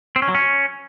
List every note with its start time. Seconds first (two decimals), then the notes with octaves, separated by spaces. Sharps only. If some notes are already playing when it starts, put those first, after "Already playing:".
0.16 C4
0.22 C#4
0.28 F#3
0.35 C#4